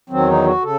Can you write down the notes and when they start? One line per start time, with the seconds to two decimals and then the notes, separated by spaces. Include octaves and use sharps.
0.10 E2 D#3 F#3 C4
0.27 D#4
0.45 F#4
0.63 C#3 A4